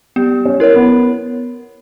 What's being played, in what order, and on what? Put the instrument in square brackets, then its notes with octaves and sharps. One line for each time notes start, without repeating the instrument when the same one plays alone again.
[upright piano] G3 [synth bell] B3
[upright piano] C#4
[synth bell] E4 A#4 C#5
[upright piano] B3